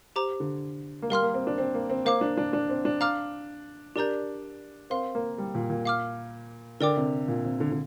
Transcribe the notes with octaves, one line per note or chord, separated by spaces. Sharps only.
G4 C5 A#5 D6
D3
A#3
G3 A#4 F5 C6 F6
A#3
C4
D4
C4
A#3
C4
A#3 C5 F5 D6
D4
D4
D4
C4
D4
F5 A#5 D6 F6
D4 G4 A#4 D5 A#5 G6
C4 A#4 F5 C6
A#3
G3
A#2
A#2
F5 D6 F6
D3 A#4 D5 G5 D6
C3
A#2
C3
D3
D3